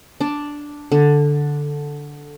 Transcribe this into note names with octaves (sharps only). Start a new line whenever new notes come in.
D4
D3